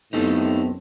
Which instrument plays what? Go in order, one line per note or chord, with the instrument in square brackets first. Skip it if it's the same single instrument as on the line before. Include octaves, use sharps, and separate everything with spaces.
[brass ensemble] F#2 A2 [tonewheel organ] B3 C4 [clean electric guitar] D#4 G4 A4